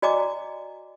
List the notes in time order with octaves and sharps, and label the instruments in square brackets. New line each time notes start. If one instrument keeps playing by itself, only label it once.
[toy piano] F#4 D5 D#5 G#5 A#5 D6